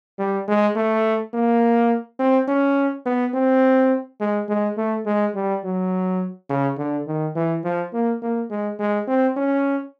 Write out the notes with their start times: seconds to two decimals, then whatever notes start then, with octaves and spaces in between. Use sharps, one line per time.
0.19 G3
0.48 G#3
0.76 A3
1.34 A#3
2.19 C4
2.48 C#4
3.06 B3
3.34 C4
4.20 G#3
4.49 G#3
4.78 A3
5.06 G#3
5.35 G3
5.64 F#3
6.50 C#3
6.78 D3
7.07 D#3
7.36 E3
7.64 F3
7.93 A#3
8.22 A#3
8.50 G#3
8.80 G#3
9.07 C4
9.36 C#4